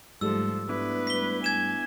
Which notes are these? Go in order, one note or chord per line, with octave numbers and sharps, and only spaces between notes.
G#2 F3 G3 A3 A4 E6
B3 D4 E4 B4
B6 G7
G#5 G#6 E7